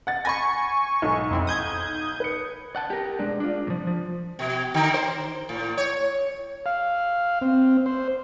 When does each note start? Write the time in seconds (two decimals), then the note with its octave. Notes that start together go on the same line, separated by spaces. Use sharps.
0.07 F#5 A6
0.25 G#5 B5 C#6 A6 A#6
1.02 B1 G#2
1.31 F2 C4 E4
1.47 D#6 G6 G#6
2.20 B4 C#7
2.76 F#5 A5
2.90 G4 A#4
3.19 G#3 D4
3.40 D4 F4
3.67 E2 F3
3.87 F3
4.39 B2
4.74 D3
4.94 C5
5.49 A2
5.77 C#5
6.66 F5
7.41 C4
7.86 C5